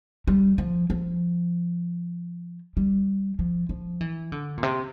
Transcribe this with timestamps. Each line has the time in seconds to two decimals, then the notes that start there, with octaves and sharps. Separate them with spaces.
0.27 G3
0.58 F3
0.90 F3
2.77 G3
3.39 F3
3.69 F3
4.01 E3
4.32 D3
4.58 A#2
4.63 C3